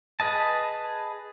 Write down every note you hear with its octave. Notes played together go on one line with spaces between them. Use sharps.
G#4 B4 D#5 A5